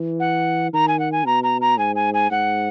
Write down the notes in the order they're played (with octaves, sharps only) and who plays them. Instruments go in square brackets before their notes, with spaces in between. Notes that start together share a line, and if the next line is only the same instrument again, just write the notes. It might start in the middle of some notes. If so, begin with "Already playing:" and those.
Already playing: [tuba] E3
[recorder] F#5
[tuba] D#3 [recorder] A#5
[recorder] G#5
F#5
G#5
[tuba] B2 [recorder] A#5
[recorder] A#5
A#5
[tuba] G#2 [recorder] G#5
[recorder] G#5
G#5
[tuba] G#2 [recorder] F#5